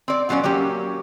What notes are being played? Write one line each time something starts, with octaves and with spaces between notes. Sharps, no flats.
C4 D5
A#2 F#3 B3 C#4 D5
F#3 A#3 C#4 G4